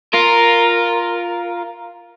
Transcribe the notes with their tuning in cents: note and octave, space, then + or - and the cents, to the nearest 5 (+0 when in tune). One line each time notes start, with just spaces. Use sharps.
F4 +0 A#4 +0